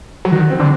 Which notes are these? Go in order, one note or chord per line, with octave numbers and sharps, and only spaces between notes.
F#3
D#3 F#4
C4
D3 D4